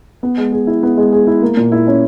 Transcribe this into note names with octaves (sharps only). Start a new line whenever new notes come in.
B3
G#3
G#4
E4
B3
G#3
G#4
E4
A#3
A#2
E4
C#4